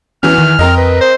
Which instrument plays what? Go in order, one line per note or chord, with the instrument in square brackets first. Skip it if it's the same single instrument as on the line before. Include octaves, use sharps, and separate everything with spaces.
[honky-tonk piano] E2 E3 [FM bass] C#4 [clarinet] F6
[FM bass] D#3
[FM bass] F2 [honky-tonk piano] C4 A#4 D#5
[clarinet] B4
C5